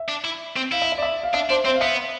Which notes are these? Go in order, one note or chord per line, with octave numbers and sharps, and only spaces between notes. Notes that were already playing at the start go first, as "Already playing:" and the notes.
Already playing: E5
D4
E4
C4
E4 F5
E5
E5
D5
E5
F5
D4 E5
D4 C5
C4 C5
F5
B3 E5